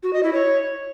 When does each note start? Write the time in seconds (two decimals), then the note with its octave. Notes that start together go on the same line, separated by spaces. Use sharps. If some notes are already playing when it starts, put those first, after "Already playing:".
0.03 F#4
0.13 D#5
0.23 E4
0.33 C#5